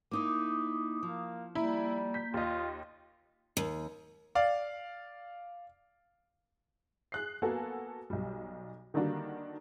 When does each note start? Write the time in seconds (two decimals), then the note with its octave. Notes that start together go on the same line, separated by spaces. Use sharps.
0.11 A#3 D#4 E4 D6 D#6
1.03 F3 A#3
1.55 G3 A#3 E4
2.14 G6 B6
2.34 D#2 F4 D#5
3.57 D#2
4.35 D5 F5
7.12 G#4 F#6 C7
7.42 A#3 B3 F#4 A4 G#5
8.10 B1 G3
8.94 D3 D#3 G3 A#3 D4 F#4